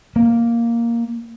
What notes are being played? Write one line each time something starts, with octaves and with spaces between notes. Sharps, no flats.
A#3